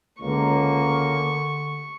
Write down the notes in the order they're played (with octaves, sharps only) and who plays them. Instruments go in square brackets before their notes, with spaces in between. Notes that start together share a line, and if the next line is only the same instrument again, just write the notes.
[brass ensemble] C#2 A#3 [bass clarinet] D3 [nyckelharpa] C#6